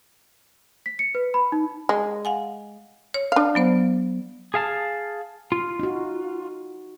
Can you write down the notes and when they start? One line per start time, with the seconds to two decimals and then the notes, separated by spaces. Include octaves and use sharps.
0.86 B6
0.99 C#7
1.15 B4
1.34 B5
1.52 D#4
1.89 G#3
2.25 F5 F#5 G#5
3.14 C#5
3.32 D4 F5
3.55 F#3 B3 C5
4.54 G#4 F5 A5
5.52 F4
5.79 D#4 F#4